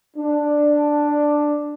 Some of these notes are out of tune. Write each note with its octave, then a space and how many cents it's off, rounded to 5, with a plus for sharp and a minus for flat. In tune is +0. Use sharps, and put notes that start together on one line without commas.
D4 +5